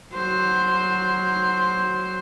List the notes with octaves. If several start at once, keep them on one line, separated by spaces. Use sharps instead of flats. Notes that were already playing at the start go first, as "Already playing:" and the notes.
F#3 C5